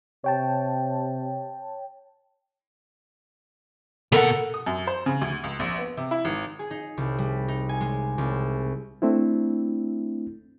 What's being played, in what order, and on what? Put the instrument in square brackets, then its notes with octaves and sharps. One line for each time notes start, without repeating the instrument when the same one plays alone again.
[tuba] C3 [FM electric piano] C#5 G5 A5
[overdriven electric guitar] B2 F#5 [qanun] A4 A#4
[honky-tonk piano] D#6
F#2
C5
C#3
D2
C#2
A#1
B3
C3
E4
G#1
[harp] G#4
D#4
C2
G3
D#4
G#5
G#3
C2
[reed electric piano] A3 C4 D4 E4